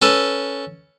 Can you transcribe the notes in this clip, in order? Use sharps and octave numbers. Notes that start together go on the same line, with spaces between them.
C#4 A4 B4